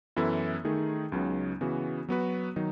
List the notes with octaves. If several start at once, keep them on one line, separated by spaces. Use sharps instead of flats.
F#2 E3 B3 E4 A4
D#3 A3 D#4 G#4
C#2 C#3 F#3 B3 D#4
C#3 E3 B3 F#4
F#3 B3 F#4 B4
D#3 F#3 D#4